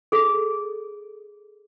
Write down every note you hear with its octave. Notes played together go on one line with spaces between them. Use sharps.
G#4 A4